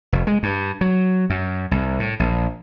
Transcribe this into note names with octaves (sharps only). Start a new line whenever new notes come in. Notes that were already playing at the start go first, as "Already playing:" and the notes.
F1
G#3
G2
F#3
F#2
C2
A2
A#1